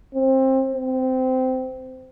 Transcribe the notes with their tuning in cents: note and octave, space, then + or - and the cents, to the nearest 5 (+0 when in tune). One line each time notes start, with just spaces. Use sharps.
C4 +20
C4 -20